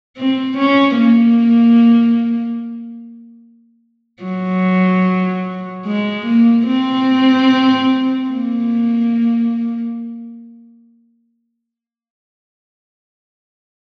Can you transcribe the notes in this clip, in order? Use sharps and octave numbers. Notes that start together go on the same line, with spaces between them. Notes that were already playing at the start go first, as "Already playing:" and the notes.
C4
C#4
A#3
F#3
G#3
A#3
C4
A#3